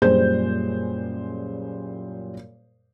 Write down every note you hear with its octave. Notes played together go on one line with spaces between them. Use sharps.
F#2 A#2 G3 G#4 C5 G6